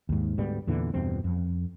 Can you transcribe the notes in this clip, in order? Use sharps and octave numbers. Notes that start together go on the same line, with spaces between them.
D#2 G#2
D2 G#2 G3 B3
E2 A#2 D3 E3
E2 G2 B2 C4
F2